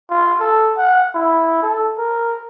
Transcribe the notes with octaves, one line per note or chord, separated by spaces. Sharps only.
F4
A4
F#5
E4
A4
A#4